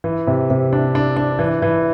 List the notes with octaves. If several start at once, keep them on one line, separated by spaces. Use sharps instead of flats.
E3
C3
C3
D4
D4
D4
E3
E3